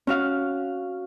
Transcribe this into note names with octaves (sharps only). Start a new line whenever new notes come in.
C#4 F#4 F5